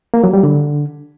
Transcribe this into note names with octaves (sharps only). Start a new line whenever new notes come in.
A#3
F#3
G3
D3